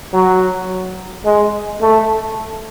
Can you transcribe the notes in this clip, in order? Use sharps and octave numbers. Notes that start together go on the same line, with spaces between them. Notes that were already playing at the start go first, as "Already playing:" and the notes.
F#3
G#3
A3